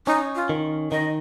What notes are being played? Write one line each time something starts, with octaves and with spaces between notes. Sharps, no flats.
C#4 D#4
F4
D#3
D#3 D#5